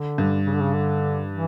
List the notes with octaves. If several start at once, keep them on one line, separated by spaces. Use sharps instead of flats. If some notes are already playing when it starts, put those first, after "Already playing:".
Already playing: D3
G2
C#3
D3
C#3
D3
E3